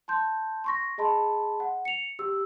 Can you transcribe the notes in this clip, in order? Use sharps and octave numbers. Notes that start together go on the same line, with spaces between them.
A5 C6 G6
C6 C#6 A#6
G#4 D#5 A5 B5 C6
F#5
C#7 F7
G4 E6